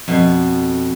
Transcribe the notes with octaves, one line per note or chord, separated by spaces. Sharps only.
F2 B2